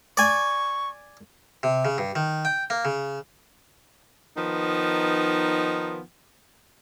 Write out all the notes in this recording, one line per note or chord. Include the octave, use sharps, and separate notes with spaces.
D5 G#5 C#6
C3
C#3
G2
D#3
G5
A#3
C#3
D#3 F3 B3 D#4